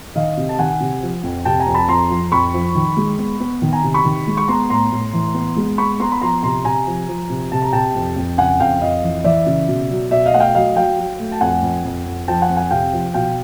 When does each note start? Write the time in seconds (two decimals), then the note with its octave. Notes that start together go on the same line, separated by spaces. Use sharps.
0.15 D#3 D#5 F5
0.37 C3
0.49 A5
0.59 D#3 F#5 G#5
0.80 C3
1.02 F3
1.23 F2
1.45 C3 G5 A5
1.60 G#5 A#5
1.67 F2
1.74 A5 B5
1.88 F2 A#5 C6
2.10 F3
2.32 F2 B5 C#6
2.54 F3
2.75 D#3
2.97 G#3
3.19 B3
3.40 B3
3.62 D#3
3.73 G#5 A#5
3.83 C3
3.94 B5 C#6
4.05 D#3
4.27 G#3
4.37 C#6
4.48 B3 A#5 C6
4.70 A2 A#5 C6
4.92 A2
5.13 E3
5.35 B3
5.57 G#3
5.78 B3 B5 C#6
6.00 B3 A#5 C6
6.12 B5
6.21 F3 A#5 C6
6.43 C3 A#5 C6
6.64 C3 G#5 A#5
6.87 F3
7.08 F3
7.30 C3
7.52 C3 A5
7.62 A#5
7.73 C3 G5 A5
7.95 F2
8.16 F2
8.38 C#3 F#5 G#5
8.59 F2 F5 G5
8.81 F2 D#5 F5
9.03 E3
9.24 E3 D5 E5
9.46 C#3
9.68 B2
9.90 F#3
10.11 B2 D5 E5
10.26 D#5 F5
10.33 A3 F#5
10.40 F5 G5
10.55 F#3 D#5 F5
10.76 F#3 F5 G5
10.98 F#3
11.19 A3
11.32 A5
11.41 F2 F#5 G#5
11.62 F2
11.84 F2
12.06 F2
12.28 F3 G5 A5
12.42 F#5 G#5
12.50 F2
12.56 F#5 G#5
12.71 C3 F5 G5
12.93 F3
13.14 B2 F5 G5